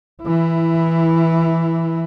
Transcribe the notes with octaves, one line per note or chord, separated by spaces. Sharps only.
E3 E4